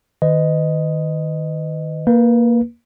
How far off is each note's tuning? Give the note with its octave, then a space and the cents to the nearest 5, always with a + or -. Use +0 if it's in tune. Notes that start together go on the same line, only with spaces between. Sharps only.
D#3 +0 B4 +40 D#5 +0
A#3 +0 B4 -20